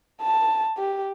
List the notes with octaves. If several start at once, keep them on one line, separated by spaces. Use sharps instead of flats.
A5
G4